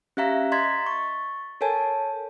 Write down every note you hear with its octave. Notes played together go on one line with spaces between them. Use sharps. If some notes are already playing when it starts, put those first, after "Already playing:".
C#4 G4 E5 F5 A#5 A#6
D#5 A#5 C6 G#6 A6 B6
C#6 A6
A4 A#4 C#5 G#5 A5